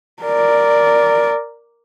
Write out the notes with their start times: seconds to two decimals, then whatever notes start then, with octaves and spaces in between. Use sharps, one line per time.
0.23 A#4 D5